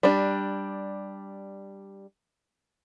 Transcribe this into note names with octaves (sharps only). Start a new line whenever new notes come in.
G3 D4